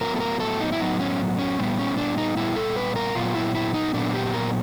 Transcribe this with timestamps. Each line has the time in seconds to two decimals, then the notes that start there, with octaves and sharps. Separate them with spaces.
0.01 A2 F#3 B3 A#4
0.16 A4
0.20 A#4
0.40 A4
0.61 D#4
0.72 E4
0.80 A2 F#3 B3 D#4
1.00 C#4
1.39 C#4
1.59 A#2 G3 B3 C4
1.79 C#4
1.97 D4
2.18 D#4
2.37 A#2 G3 B3 E4
2.56 A4
2.76 B4
2.96 A#4
3.15 A#2 F#3 B3 F4
3.35 E4
3.55 E4
3.74 D#4
3.94 A#2 F#3 B3 D4
4.14 G4
4.34 A#4